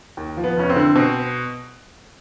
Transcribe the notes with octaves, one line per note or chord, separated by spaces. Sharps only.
D#2
F3
B3
F1 C#4
C4
D3
B2 C4